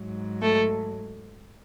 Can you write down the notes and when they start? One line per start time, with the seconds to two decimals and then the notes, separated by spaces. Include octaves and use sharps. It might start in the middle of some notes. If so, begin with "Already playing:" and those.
Already playing: G#2 F#3
0.42 A3 A4